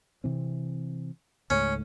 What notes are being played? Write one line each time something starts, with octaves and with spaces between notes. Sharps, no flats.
C3 E3 C4
C#2 G#2 A3 C#4